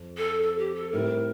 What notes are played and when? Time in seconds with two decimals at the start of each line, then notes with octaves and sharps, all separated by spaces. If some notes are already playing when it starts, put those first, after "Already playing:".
Already playing: F2
0.18 A4
0.42 A4
0.59 G4
0.75 A4
0.92 A2 G3 C4 E4 A#4